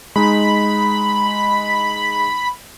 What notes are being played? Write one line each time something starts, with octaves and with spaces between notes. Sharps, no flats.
G#3 D#4 B5